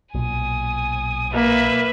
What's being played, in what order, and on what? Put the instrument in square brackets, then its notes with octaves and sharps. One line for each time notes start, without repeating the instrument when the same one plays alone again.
[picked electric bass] B1 A#2 [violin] G#5 D#6
[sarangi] A#3 [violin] B4 E5